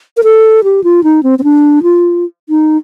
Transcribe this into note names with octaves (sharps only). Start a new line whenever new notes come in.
A#4
A4
G4
F4
D#4
C4
C4
D4
F4
D#4